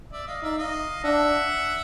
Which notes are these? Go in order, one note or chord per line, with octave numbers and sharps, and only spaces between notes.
D5 E5
D#5 F5
D#4 D5 E5
D#5 F5
D4 E5 F#5